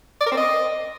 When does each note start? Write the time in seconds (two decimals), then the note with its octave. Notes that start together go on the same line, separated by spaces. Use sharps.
0.21 D5
0.26 A#4
0.32 C4
0.37 D#5